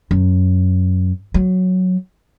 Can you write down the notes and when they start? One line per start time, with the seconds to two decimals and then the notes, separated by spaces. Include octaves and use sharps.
0.11 F#2
1.34 F#3